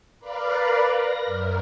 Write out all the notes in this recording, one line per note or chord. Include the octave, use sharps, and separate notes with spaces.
A#4 B4 D5 F5 B5
A#6
F#2 A#4